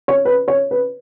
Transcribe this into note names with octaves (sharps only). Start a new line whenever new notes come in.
C#5
B4
C#5
B4